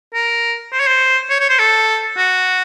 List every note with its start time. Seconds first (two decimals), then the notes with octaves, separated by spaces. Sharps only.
0.14 A#4
0.72 C5
0.80 C#5
0.87 C5
1.30 C#5
1.40 C#5
1.49 C5
1.59 A4
2.17 F#4